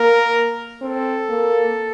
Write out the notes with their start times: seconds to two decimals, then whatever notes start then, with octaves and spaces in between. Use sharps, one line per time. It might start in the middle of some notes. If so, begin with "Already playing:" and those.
Already playing: A#3 A#4
0.81 C4 A4
1.29 A#3